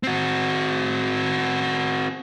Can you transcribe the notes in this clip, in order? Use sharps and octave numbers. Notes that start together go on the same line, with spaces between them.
C4 F#4